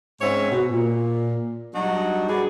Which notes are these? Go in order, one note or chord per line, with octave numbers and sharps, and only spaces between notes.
G#2 C4 C#4 C#5 E5
B2
A#2
F#3 G3 D4 D#4 F#4
G2 F#4 G#4 B4 D5